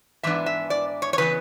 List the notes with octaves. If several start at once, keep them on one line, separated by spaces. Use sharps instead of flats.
G#2 E3 B3 D4 E5
E5
D5
C#5
C#5
C#3 E3 B3 B4